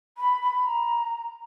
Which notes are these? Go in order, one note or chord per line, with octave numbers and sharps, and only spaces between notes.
B5
B5
A#5